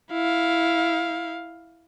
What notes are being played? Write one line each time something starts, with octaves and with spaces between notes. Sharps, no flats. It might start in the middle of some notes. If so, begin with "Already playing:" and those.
E4 F5